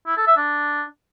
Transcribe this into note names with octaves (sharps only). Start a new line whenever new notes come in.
E4
A4
E5
D4